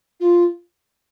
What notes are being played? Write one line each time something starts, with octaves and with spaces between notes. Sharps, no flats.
F4